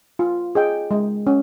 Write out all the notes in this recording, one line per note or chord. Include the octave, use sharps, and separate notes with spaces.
F4
G#4 D#5 G5
G#3
C#4